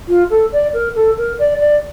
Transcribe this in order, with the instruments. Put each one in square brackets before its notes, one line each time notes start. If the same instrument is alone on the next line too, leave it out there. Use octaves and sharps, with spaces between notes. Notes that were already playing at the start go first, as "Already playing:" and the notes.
[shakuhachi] F4
A4
D5
A#4
A4
A#4
D5
D5